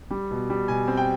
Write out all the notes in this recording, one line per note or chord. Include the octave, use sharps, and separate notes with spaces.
G3
B2
G3
B2 G#5
C4
G5